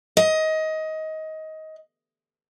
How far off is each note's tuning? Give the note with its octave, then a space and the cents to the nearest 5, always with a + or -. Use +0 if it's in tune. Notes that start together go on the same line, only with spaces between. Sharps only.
D#5 +20